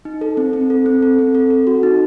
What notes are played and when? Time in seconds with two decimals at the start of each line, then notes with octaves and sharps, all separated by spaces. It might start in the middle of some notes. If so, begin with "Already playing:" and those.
0.05 D#4
0.21 A4
0.37 C4
0.53 C4
0.70 A4
0.86 C4
1.03 A4
1.19 C4
1.35 A4
1.50 A4
1.67 F#4
1.83 D#4